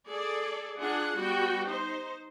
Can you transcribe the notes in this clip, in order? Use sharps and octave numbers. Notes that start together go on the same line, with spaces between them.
G#4 A4 D5
D4 F4 G#4 F#5
G3 B3 F#4 G5
D#4 C5